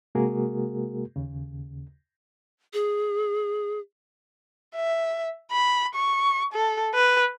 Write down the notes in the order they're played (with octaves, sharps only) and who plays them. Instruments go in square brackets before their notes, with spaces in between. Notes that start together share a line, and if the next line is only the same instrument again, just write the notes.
[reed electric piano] C3 G#3 A#3 F#4 G#4 A#4
D#2 C#3
[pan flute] G#4
[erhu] E5
B5
C#6
A4
B4